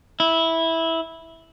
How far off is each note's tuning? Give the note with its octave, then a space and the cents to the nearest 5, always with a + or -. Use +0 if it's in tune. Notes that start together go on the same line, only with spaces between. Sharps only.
E4 -10